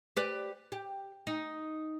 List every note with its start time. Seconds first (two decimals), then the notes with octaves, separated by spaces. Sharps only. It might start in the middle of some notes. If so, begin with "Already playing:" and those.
0.17 G4 B4 D5
0.72 G4
1.27 D#4